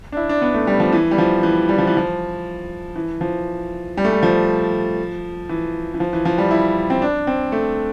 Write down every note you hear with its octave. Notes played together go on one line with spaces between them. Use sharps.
D4
E4
D4
B3
A3
G3
F3
E3
G3
F3
E3
G3
F3
E3
F3
E3
F3
G3
A3
G3
F3
E3
E3
F3
E3
F3
G3
E4
C4
D4
C4
A3